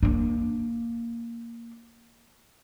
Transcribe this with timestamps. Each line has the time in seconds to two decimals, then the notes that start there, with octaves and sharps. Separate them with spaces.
0.03 A#3 D4